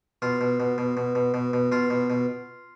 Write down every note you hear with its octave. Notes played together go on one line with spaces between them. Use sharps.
B2 F4
B2
B2
B2
B2
B2
B2
B2
B2 F4
B2
B2